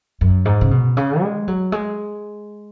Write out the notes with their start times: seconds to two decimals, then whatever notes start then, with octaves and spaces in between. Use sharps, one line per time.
0.21 F#2
0.45 G#2
0.61 C#3
0.71 B2
0.97 C#3
1.22 G#3
1.48 F#3
1.72 G#3